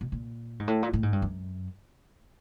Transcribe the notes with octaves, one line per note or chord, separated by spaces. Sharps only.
B2
A#2
G#2
A2
A#2
A2
G#2
G2
F#2